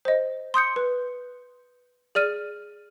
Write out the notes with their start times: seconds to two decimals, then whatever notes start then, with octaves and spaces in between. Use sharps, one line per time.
0.05 C5 D#5
0.54 C6 D#6 G6 C#7
0.76 B4
2.15 G#4 D5 F6 D#7